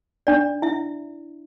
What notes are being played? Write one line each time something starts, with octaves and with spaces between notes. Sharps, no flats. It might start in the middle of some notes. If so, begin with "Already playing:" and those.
D4 D5
E4 E5